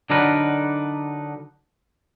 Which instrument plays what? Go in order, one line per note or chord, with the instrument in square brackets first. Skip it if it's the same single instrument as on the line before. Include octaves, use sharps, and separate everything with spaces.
[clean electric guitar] D3 F#3 D4 D#4 A#4 B4